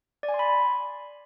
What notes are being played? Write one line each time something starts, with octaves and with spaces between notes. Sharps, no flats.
D5
G#5
C6
B5